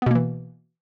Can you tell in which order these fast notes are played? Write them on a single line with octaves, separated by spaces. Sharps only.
B3 B2 A#3 E3